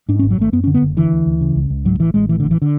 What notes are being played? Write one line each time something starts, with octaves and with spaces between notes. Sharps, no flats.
G#2 D4
C#4
G#1
F#3
G#1 A3
F#2 B3
C#4
D3
B3
F#1
D3 E3
D2
D2
C#3
C#2
C#2
G#2 F#3
A1 E3
A1 G#3
A2 E3
D3
A1
E3
D3